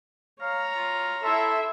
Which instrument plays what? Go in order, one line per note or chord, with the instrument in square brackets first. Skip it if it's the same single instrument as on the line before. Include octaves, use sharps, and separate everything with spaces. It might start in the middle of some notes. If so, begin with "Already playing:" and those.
[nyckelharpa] C#5 A#5 [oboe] F5
[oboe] F4
[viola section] E4 E5 [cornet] A4 [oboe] C6